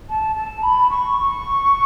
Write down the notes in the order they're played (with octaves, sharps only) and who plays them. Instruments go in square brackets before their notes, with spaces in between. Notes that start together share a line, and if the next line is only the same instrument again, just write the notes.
[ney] A5
A5
B5
C#6